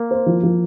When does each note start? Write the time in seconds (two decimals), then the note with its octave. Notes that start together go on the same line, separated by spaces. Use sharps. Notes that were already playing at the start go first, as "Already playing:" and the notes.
Already playing: A#3
0.11 C5
0.26 F3
0.43 F3